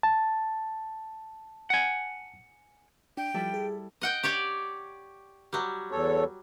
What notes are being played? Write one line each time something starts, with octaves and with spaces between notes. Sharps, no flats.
A5
F#5 G#5
D4 G5
F3 G3 E4 A4
G#4
D#5 F#5 G5
G4 C#5 D5
F#3 G3
E2 A4 C#5